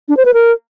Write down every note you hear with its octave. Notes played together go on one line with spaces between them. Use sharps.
D4
C5
B4
A#4